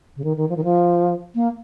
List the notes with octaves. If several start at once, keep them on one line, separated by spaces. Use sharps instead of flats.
C#3
D#3
D#3
F3
D#3
F3
A#3